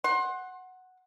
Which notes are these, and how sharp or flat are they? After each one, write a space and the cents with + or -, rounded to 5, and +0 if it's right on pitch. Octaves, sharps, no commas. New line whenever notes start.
F#5 +0 C6 +25